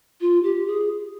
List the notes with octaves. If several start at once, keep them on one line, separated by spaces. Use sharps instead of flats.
F4
G4
G#4